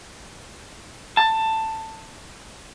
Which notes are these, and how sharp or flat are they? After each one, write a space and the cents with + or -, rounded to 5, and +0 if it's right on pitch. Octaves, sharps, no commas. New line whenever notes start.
A5 +15